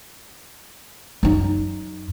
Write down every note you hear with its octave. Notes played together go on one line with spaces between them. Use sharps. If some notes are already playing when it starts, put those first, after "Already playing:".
F#2 D#4